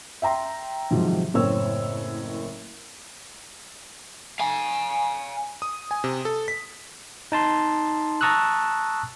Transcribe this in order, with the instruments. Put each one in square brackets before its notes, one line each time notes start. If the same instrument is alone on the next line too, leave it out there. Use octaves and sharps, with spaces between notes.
[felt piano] E5 G5 A#5 C6
G#2 C3 D#3 F3 F#3
F#1 A2 C4 A#4 C#5 E6
[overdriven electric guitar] F5 G#5
[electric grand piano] D#6
G#5
C3
A4
B6
[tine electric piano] D#4 A5 C6
A5 A#5 C#6 D#6 E6 F#6